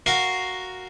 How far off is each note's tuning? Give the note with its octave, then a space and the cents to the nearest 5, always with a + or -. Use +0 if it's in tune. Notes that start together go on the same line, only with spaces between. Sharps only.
F#4 +0 A#4 +0 F5 +0